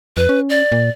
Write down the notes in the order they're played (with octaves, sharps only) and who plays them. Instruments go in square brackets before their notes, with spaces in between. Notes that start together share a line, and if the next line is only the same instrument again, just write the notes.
[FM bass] F2 [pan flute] B4
[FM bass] C#4
[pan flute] D5
[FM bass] A#2